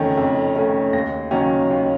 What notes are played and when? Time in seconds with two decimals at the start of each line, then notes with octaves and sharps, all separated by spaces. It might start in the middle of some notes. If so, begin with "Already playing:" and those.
Already playing: F2 D#3 A3 C#4
0.17 F2
0.56 D#3 A3 C#4
0.93 D#2 A#6
1.31 D#3 F#3 A#3 C#4
1.70 D#2